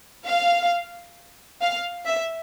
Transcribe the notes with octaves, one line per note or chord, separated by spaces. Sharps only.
F5
F5
E5